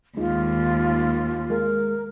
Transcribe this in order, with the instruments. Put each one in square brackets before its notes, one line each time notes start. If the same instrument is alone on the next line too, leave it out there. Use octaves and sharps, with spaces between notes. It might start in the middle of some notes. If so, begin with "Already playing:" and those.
[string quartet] D#2 [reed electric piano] G#3 D#4 [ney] F4
[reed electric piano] G#3 [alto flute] A#4